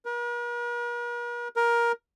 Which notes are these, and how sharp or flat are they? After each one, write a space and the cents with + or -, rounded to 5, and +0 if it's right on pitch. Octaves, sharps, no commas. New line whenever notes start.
A#4 +45
A#4 +15